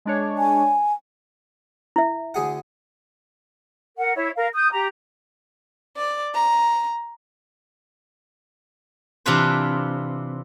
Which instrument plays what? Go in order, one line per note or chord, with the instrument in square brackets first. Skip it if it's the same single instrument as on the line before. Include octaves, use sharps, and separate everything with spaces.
[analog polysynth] G#3 D4 C#5
[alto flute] G#5
[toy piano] E4 E5
[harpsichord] D2 G#4 F#5
[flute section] A#4 F#5
E4 C#5
A#4 F5
D#6 G6
G4 A#5
[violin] D5
A#5
[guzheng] C3 E3 D4 F4 B4 C5